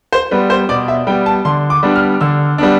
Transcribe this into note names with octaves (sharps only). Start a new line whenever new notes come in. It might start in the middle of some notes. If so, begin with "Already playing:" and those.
C5
G3 B3 B4
C5
B2 D5
E5
G3 B3 G5
A5
D3 C6
D6
G3 B3 D4
F6
D3 E6
G3 B3 D4